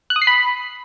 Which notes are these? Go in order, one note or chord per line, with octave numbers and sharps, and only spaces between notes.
F#6
D#6
C7
B5